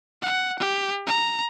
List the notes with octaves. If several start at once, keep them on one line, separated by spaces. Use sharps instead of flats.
F#5
G4
A#5